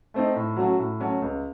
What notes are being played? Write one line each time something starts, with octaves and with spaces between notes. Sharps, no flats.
A3 C4 D#4
A2
F#3 A3 C#4 F#4
A2
F#3 A3 C#4 F#4
C#2